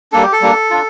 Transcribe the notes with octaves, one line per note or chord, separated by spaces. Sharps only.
G3 A#3 D4 A4
G4
A4
G3 A#3 D4
D4 F4